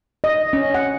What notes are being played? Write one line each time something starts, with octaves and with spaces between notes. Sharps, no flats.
D#5
C#4
F#5